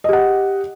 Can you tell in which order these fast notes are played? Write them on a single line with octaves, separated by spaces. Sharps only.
D#5 G4 F#5